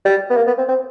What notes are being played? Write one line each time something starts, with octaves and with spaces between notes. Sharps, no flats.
G3
B3
A#3
B3
C4
C4